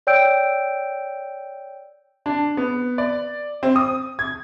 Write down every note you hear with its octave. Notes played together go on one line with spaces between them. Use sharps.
C#5 D5 G5 E6 G6 D7
D4
B3
D5
C4
D#6
G#6